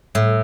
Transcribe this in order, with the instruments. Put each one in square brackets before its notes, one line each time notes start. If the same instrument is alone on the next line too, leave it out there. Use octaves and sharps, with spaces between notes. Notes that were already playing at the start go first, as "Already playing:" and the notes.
[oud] A2